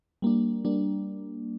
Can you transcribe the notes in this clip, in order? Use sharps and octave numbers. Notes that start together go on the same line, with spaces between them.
G3 A#3 D4
G3 A#3 D4